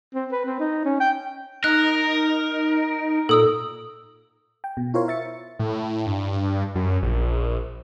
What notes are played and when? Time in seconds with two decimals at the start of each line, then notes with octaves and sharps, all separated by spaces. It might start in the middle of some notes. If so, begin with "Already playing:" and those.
0.14 C4
0.32 B4
0.45 C4
0.60 D#4
0.85 C#4
1.00 G5
1.64 D#4 A#4 F#6 A#6
3.29 A#2 A4 D#6 E6
4.64 G5
4.77 B2
4.94 E4 F4 A#4 C5 C#5 F5
5.08 E5 A6 C#7
5.59 A2
6.06 G2
6.75 F#2
7.02 A#1